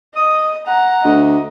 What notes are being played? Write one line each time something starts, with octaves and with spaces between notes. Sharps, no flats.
D#5 D#6
F#5 A#5
D2 D#5